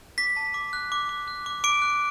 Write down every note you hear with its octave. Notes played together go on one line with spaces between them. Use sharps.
D6 B6
A5
D6
F#6
D6
D6
F#6
D6
D6 D7
F#6